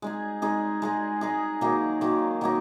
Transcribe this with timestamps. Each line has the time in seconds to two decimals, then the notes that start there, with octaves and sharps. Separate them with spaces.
0.02 G#3 D#4 G#4
0.42 G#3 D#4 G#4
0.82 G#3 D#4 G#4
1.21 G#3 D#4 G#4
1.61 D#3 F#3 A#3 D#4
2.01 D#3 F#3 A#3 D#4
2.41 D#3 F#3 A#3 D#4